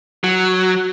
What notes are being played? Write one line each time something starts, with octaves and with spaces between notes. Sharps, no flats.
F#3